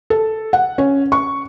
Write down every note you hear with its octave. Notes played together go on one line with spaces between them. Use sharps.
A4
F#5
C#4
C#6